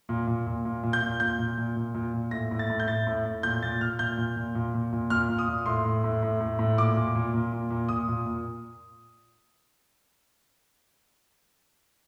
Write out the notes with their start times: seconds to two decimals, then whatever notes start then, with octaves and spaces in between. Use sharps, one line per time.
0.09 A#2
0.27 A#2
0.46 A#2
0.65 A#2
0.83 A#2
0.93 G6
1.02 A#2
1.20 A#2 G6
1.39 A#2
1.58 A#2
1.76 A#2
1.94 A#2
2.13 A#2
2.31 A2 A#6
2.51 A2
2.59 A6
2.70 A2
2.80 G6
2.87 A2 A6
3.07 A2
3.25 A2
3.43 A#2 G6
3.62 A#2 A6
3.81 A#2 F6
3.99 A#2 G6
4.17 A#2
4.36 A#2
4.55 A#2
4.74 A#2
4.92 A#2
5.10 A#2 F6
5.29 A#2
5.39 D#6
5.48 A#2
5.66 A2 C6
5.84 A2
6.04 A2
6.23 A2
6.40 A2
6.59 A2
6.77 A#2 D6
6.96 A#2
7.15 A#2
7.33 A#2
7.52 A#2
7.70 A#2
7.89 A#2 D#6
8.08 A#2
8.26 A#2